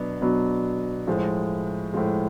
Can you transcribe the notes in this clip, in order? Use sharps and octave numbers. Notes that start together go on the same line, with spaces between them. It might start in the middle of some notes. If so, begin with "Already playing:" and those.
Already playing: B2 F#3 B3 D4
B2 F#3 B3 D4
A2 F3 G#3
A2 F3 G#3